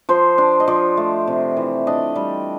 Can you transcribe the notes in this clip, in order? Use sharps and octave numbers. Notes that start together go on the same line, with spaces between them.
F3 C5
D4
D#5
F3 D5
A3
C3
E3
D4 D#5
G3